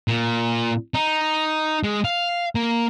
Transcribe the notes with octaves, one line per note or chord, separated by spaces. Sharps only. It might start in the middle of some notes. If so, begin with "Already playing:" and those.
A#2
D#4
G#3
F5
A#3